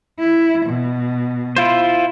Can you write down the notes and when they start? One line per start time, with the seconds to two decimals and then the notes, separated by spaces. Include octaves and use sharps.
0.20 E4
0.66 B2
1.56 E4 F4 C5